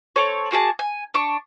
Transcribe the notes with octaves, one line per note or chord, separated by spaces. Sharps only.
C4 A4 C#5
A#3 F#4 G#4 A5
G#5
D4 C#6